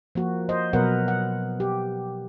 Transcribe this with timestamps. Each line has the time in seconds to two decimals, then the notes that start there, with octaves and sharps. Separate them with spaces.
0.15 F3 A#3 F#4
0.49 C5 D#5
0.73 B2 F#3 B3 A#4 B4 F#5
1.08 F#5
1.60 G4